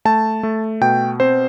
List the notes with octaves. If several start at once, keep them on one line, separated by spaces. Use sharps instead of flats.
A3 A5
A3
B2 G5
C4 C5